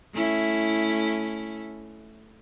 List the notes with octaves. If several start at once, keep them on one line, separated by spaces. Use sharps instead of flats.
A3 C#4 E4